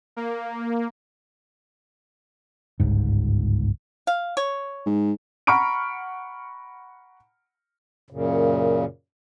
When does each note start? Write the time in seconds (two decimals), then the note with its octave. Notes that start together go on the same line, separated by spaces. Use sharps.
0.16 A#3
2.80 G1 C#2 G#2
4.07 F5
4.37 C#5
4.86 G#2
5.47 F#5 A#5 B5 C#6 F6 D7
8.11 F#2 A#2 C#3